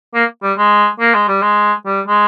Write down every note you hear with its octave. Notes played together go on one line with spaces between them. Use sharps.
A#3
G3
G#3
A#3
G#3
G3
G#3
G3
G#3